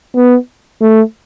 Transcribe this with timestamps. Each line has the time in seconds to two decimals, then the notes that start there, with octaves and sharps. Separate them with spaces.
0.16 B3
0.81 A3